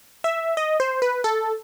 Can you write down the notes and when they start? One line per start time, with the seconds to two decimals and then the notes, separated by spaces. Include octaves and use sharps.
0.24 E5
0.57 D#5
0.80 C5
1.02 B4
1.24 A4